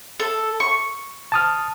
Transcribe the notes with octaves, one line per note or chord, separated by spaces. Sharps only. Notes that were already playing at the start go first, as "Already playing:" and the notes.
A4
C#6
A5 D#6 F6